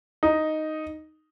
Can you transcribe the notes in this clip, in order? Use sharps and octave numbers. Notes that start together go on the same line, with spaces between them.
D#4